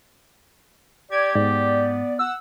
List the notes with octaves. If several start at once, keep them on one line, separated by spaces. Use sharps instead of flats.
G4 D5 G#6
G#2 B3 D5
F#5 E6